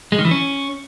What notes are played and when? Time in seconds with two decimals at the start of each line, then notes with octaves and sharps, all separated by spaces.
0.12 G#3
0.18 D#3
0.25 E3
0.31 C#4